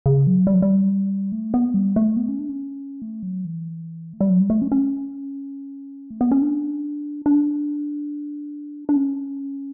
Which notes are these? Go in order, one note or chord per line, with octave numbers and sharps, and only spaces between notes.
C#3
F#3
G3
F#3
G3
A3
B3
G3
A3
B3
C#4
D4
C#4
A3
F#3
E3
A3
G3
F#3
G3
A3
C#4
C#4
A3
B3
C#4
D4
D4
D4
C#4